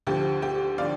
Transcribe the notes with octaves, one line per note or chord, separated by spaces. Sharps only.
D2 D3 F3 G4
G4
D3 F3 D5 F5